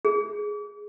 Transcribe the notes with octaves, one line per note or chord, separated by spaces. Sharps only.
G#4